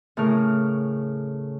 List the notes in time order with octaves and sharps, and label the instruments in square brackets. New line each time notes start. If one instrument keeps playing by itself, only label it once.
[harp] A2 C#3 A#4 F6